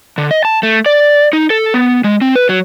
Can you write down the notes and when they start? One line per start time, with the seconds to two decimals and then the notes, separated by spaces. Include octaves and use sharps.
0.18 D3
0.31 D#5
0.45 A5
0.63 A3
0.86 D5
1.33 D#4
1.50 A4
1.74 B3
2.04 G#3
2.21 C4
2.36 B4
2.49 F#3